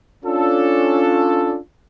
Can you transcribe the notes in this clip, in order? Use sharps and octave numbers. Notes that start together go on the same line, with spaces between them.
C#4 D4 F4 A4